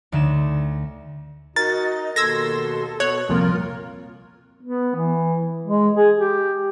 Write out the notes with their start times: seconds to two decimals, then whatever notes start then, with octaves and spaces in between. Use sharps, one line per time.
0.12 D2 D3 A3 D#4 E7
1.56 D#4 F#4 A#4 D#5 A6
2.16 D#2 B2 A4 C6 E6 G#6 A#6
3.00 B2 B3 C#5 F#6
3.29 C2 F2 A#2 F4 A#4
4.63 B3
4.95 E3
5.66 G#3
5.96 G#4
6.18 G4